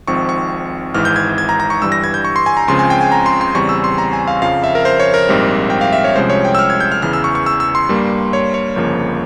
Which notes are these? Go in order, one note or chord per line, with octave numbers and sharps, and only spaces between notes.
G#1 G#2 F3 C4 C#6
C#6
G#1 G#2 E3 F6
G6
G#6
G#6
A#5
A#5
C#6
G1 G2 E3 G3 E6
A#6
G#6
G6
C#6
C6
G#5
A#5
C#2 C#3 F3 C4 C6
G#5
G5
G#5
A#5
C6
C6
E2 C#3 G3 C4 C#6
E6
C6
A#5
G#5
F5
F2 C#3 F3 F5
E5
A#4
C5
C#5
A#4
A#1 G#2 G3 C4
G5
F5
E5
C#5
C2 C3 F3 G#3 C#4 C5
C#5
G5
E6
F6
G#6
G6
F6
E2 C#3 E3 F6
E6
C#6
C#6
E6
E6
C6
G2 G3 A#3
C#5
C#5
G1 F2 C#3 F3 A#3